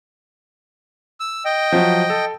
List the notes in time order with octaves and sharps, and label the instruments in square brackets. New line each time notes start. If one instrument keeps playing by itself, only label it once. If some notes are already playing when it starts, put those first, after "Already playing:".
[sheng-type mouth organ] E6
D#5 G5
[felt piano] F3 F#3
A4